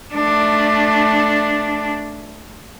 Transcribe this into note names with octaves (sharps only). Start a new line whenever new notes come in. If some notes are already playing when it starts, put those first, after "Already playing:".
A3 D4